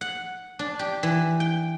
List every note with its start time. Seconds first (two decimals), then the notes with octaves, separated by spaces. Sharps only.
0.01 F#5
0.59 D4
0.79 G4
1.03 E3
1.40 G5